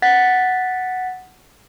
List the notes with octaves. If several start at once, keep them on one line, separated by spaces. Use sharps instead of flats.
F#5 A6 B6